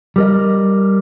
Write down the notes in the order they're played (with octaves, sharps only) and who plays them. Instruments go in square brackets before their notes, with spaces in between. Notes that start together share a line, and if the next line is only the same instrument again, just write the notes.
[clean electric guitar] G3 A#4 D#5